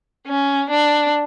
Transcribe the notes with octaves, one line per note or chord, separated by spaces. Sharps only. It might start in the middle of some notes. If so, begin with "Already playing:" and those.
C#4
D4